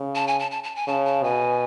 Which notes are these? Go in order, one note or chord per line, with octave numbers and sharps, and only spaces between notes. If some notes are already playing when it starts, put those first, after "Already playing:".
Already playing: C#3
A5
G#5
A5
A5
A5
G#5
C#3 A5
A5
B2 G#5